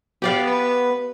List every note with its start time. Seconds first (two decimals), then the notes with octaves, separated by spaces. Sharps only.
0.22 B3 G4 D5 F5
0.47 B4